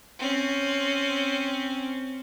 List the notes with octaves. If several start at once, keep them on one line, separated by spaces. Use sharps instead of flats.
C4 C#4